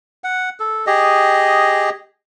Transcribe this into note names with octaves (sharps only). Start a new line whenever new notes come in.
F#5
A4
G4 G#4 D#5